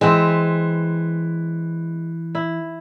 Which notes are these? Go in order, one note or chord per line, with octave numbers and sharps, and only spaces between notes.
E3 G#3 C4 E5
E4